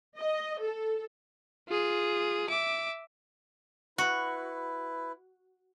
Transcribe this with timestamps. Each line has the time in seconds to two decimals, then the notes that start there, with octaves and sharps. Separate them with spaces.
0.17 D#5
0.61 A4
1.68 F4 G#4
2.49 E5 D6
3.98 E4 F#4 B4